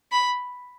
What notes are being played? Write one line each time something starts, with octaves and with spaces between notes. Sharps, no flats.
B5